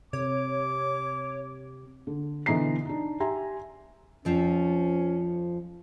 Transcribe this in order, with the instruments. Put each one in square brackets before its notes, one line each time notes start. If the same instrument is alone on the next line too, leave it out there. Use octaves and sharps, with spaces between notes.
[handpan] C3 [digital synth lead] C#5 [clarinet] D6
[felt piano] D3
B2 D3 E3 D#5 A#5 C7
D4 D#4
G4 E5 G#5 A#5 C6
[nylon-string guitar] F2 F3 C4 [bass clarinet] C#4